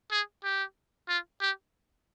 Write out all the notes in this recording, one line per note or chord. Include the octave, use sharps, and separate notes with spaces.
G#4
G4
F4
G4